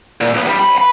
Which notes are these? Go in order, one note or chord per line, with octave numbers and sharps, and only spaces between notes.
A#2
B1 B3
B2 G3
C2 B5
B4 B5